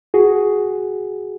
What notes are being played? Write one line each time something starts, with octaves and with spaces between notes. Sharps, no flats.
F#4 G#4